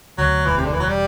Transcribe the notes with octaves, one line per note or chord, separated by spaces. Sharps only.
D2 F#3
E1 E3
C3
D3
E1 E3
F#3
G3